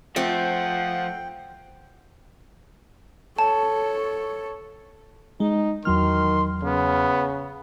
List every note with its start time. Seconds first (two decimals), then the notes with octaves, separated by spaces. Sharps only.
0.16 F3 A3 C4 F#5 G5
3.39 A4 C#5 A5
5.40 G#3 D#4
5.85 E2 D#3 F#3 C6 F6
6.63 C#3 B3